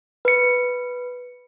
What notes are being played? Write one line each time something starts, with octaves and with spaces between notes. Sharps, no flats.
B4 C#7